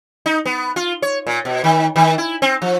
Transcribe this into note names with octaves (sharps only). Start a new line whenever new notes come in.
D#4
B3
F4
C#5
A#2
B2
D#3
D#3
E4
C4
F3